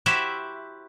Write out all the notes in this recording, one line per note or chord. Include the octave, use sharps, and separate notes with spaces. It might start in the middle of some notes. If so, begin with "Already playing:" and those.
E4 F#4 G4 C5 E5